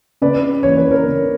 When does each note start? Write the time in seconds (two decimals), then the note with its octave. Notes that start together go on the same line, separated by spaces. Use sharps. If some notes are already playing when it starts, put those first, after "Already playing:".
0.22 C#3 B4 D5
0.63 E3 A#3 C#4 C#5
0.77 B4
0.90 A#4 C#5
1.05 C#3